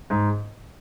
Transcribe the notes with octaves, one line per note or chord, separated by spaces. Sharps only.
G#2